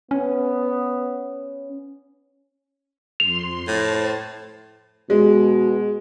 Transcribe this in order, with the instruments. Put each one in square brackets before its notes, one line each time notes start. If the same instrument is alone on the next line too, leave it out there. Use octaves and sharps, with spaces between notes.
[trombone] B3 [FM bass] C#4
[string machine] F2 C6 [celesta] F7
[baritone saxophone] A2 [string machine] C5 A5 A6
[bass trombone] B2 [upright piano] G#3